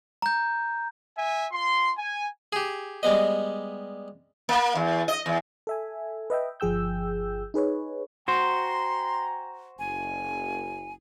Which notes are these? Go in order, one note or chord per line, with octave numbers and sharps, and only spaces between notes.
A#5 G6
E5 G#5
F4 C6
G#5
G4 G#4
G3 G#3 B3 D#5
A#3
E2
D#5
E2
A4 E5 G#5
B4 D#5 E5 G5
G1 F3 G#4 G5 E6 G6
D#4 G#4 B4 C#5
F#4 C5 G5 G#5 A#5 C6
F#1 G#5